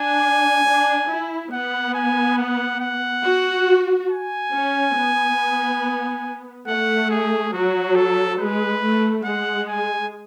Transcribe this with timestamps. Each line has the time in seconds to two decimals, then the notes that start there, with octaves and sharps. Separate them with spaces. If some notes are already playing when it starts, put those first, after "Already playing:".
Already playing: D4 G#5
0.66 D4
1.10 E4
1.52 B3 F#5
1.94 G#5
2.38 F#5
2.80 F#5
3.24 F#4
4.09 G#5
4.53 C#4
4.96 B3
6.67 A3 F#5
7.10 G#4
7.53 F#3 F#4
7.95 A4
8.39 G#3 B4
8.82 A3
9.24 G#3 F#5
9.68 G#5